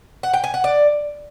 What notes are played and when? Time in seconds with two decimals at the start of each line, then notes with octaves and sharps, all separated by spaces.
0.23 F#5
0.33 G5
0.44 G#5
0.54 F#5
0.64 D5